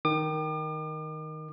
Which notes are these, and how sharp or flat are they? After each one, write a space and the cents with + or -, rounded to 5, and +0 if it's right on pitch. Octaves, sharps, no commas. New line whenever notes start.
D#3 +0 D6 +45